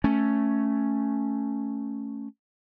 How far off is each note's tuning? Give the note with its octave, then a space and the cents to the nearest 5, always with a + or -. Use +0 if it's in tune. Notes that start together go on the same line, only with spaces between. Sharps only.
A3 +0 C#4 +0